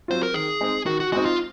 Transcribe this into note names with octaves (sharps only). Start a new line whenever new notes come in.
F#3 C4 F4 C5
A#4
D#3 G#4
G#3 C4 D#4
D#3 F#4
F#4
G#3 C4 D#4 F#4
F4